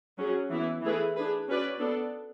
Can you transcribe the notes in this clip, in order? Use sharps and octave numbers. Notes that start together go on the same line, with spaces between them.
F#3 C#4 G#4
E3 B3 E4
E3 A3 E4 G#4 B4
D4 G#4 B4
C#4 F#4 B4 D5
B3 D4 A4